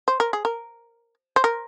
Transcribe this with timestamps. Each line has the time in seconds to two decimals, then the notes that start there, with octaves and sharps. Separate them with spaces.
0.08 C5
0.20 A#4
0.33 G#4
0.45 A#4
1.36 C5
1.44 A#4